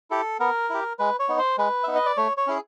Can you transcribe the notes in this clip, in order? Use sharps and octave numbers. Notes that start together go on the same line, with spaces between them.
E4 G4 A4
B3 A#4
E4 G4
G#3 B4
C#5
B3 D#4
C5
G#3 B4
B3 D#4 E5
D#5
D5
A3 C#5
C#5
C#4 E4 G#4